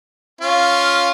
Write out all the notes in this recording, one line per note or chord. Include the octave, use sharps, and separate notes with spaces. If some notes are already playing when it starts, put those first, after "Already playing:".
C#4 F4 F5